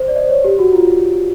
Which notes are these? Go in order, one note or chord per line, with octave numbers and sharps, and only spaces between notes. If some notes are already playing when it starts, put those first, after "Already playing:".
Already playing: C5
D5
D#5
C5
C#5
G4
F#4
F4